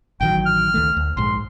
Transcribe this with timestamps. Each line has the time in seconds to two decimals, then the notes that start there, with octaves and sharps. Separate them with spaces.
0.21 A1 D#3 F#3 G5
0.46 F6
0.74 C#2 D#3 A3
0.97 D2
1.17 A#1 G#2 C6